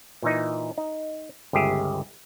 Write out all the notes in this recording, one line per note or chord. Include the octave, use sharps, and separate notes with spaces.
A#2 E3 D#4
D#4
G1 C#2 G4 G#4 E5